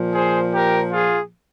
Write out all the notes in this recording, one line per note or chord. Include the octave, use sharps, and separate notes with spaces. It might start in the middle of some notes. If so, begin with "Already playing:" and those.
Already playing: A#2 F3
G#4 C5
G4 A#4
F4 G#4